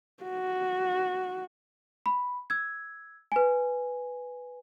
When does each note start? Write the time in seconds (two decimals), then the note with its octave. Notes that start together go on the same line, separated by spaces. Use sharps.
0.23 F#4
2.06 B5
2.50 E6 G#6
3.32 B4 G#5